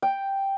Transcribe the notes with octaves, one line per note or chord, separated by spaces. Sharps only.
G5